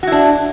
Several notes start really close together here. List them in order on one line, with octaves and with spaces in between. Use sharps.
F#4 E4 D4